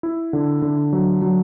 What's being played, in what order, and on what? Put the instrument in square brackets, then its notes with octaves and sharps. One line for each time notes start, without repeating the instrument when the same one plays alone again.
[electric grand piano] E4
D3
D3
F#3
F#3